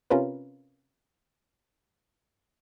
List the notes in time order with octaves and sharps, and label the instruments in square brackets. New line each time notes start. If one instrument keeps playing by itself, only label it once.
[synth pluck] C3 C#4 F4 A#4 B4